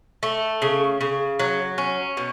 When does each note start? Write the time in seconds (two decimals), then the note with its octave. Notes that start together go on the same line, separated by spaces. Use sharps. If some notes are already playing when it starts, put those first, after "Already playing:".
0.23 A3
0.62 C#3
1.01 C#3
1.40 F#3
1.78 C#4
2.17 B2